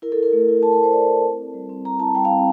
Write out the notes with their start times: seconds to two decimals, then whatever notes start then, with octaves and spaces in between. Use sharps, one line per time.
0.02 E4 A#4
0.12 A4
0.17 E4
0.23 A#4
0.33 A3
0.48 E4
0.63 E4 A5
0.73 A#4
0.79 A3 C5
0.93 E4 D5
1.08 E4
1.24 C4
1.40 C4
1.54 G3
1.69 C4
1.85 G3 A#5
1.99 E4 A5
2.15 G3 G5
2.25 F5
2.31 C4